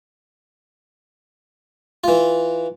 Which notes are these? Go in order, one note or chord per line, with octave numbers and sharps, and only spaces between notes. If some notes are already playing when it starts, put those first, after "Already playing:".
E3 F4